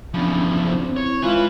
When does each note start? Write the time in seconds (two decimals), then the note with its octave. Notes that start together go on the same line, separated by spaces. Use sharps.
0.14 E2 F3 C#4 D4 B5
0.67 C4 D4 C5
0.82 C4
0.97 E4 C#5
1.23 G#3 E4 F4 B4